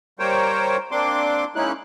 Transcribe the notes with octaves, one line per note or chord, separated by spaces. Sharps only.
G3 A#3 A#4 C5 C#5 G5
A#3 C4 D4 C6 D6
G#3 A#3 C#4 D#4 E4 F#6